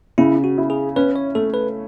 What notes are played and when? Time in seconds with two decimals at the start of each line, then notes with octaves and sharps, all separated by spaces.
0.18 C#3 E4
0.44 F#4
0.58 E4
0.70 G#4
0.96 C#4 B4
1.16 C#5
1.35 A3 A4
1.54 B4